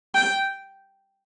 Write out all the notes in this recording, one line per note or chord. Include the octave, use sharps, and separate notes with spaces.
G5